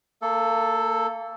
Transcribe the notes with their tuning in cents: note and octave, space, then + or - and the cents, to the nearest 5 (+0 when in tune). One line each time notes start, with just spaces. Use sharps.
A#3 -30 A4 +0